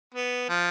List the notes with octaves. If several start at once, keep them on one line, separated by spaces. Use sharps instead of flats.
B3
F3